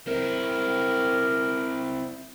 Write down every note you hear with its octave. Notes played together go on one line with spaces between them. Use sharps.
C4 E4 A#4